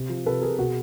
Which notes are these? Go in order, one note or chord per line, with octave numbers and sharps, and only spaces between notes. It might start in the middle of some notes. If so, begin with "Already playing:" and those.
Already playing: C3
F3
C3 A4 B4
F3 G#4 A#4
B2 F#4 G#4